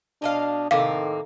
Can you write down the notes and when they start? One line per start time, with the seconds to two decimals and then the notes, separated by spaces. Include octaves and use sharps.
0.22 B2 D4 D#5 F5
0.71 A2 C3 D#3 A#3 F5